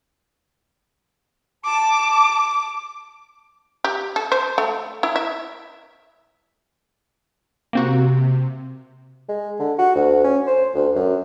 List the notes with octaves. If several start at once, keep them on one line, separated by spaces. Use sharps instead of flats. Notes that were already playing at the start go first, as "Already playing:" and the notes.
A5 D6
G4
A4
C5
A3
E4
E5
C3 A#3 C4 F#4
G#3
D3
F#4
D2
C#4
C5
D2
F#2